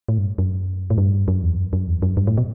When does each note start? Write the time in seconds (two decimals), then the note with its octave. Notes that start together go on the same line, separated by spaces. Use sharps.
0.09 A2
0.18 G2
0.38 F#2
0.90 A2
0.98 G2
1.28 F#2
1.43 E2
1.58 F#2
1.73 F#2
1.87 E2
2.02 F#2
2.17 G2
2.27 A2
2.37 B2